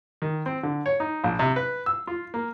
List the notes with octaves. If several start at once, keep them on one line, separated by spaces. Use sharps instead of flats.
D#3
C4
D3
C#5
D#4
A#1
C3
B4
E6
F4
A#3